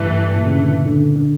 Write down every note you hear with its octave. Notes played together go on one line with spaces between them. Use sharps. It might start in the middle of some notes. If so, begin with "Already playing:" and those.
Already playing: G2 C#3 E3 A3
A#2
C#3
D3
D3
D3